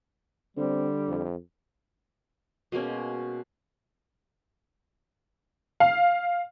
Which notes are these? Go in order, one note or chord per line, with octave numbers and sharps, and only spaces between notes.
D3 G3 C4
F2
B2 G#3 A#3 C#4
F5